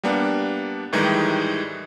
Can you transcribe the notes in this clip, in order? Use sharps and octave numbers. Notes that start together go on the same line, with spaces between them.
G3 A#3 B3 D4
A2 D#3 E3 G3 G#3 D#4